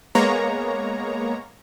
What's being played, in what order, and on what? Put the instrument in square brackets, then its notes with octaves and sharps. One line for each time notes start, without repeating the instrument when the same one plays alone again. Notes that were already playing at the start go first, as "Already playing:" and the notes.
[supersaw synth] G#3 A#3 B3 C#5 A#5